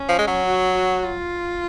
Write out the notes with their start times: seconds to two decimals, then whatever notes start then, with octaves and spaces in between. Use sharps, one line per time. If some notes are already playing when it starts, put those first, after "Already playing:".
Already playing: C#4
0.09 F3
0.18 G#3
0.27 F#3
0.47 F#4
0.75 F#4
1.04 F4